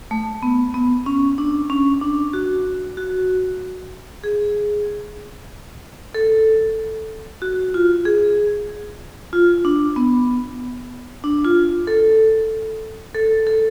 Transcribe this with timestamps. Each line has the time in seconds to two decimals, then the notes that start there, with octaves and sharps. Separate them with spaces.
0.11 A3
0.43 B3
0.74 B3
1.06 C#4
1.38 D4
1.70 C#4
2.01 D4
2.33 F#4
2.97 F#4
4.24 G#4
6.15 A4
7.42 F#4
7.74 F4
8.05 G#4
9.33 F4
9.65 D4
9.96 B3
11.24 D4
11.45 F4
11.87 A4
13.14 A4
13.47 A4